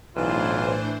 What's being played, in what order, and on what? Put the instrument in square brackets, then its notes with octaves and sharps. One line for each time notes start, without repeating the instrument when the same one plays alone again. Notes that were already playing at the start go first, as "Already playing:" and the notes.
[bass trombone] B1 [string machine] A2 D4 C5 [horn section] E3 [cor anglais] F4